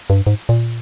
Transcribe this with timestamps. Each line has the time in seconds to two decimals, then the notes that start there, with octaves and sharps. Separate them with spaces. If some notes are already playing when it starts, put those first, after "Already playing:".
0.10 G2
0.27 G#2
0.49 A#2